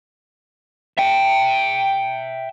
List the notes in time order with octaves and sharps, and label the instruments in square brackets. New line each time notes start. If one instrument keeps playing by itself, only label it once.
[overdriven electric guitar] E5 G5